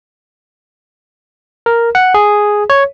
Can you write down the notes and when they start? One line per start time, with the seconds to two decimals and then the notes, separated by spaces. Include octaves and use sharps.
1.66 A#4
1.95 F#5
2.14 G#4
2.70 C#5